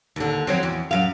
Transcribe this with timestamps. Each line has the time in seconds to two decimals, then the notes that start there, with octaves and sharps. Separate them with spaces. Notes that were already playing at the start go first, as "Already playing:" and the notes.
0.16 D#2 D3
0.47 F3 F#3 C4
0.63 E2
0.91 F#2 F5